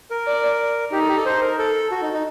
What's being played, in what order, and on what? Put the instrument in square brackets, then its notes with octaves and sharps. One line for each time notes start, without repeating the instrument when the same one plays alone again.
[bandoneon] A#4
[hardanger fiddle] D5
[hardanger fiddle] D#4 [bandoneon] G4
[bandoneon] A4
G4
A4
C5
A#4
A4
F#4
D#4
D#4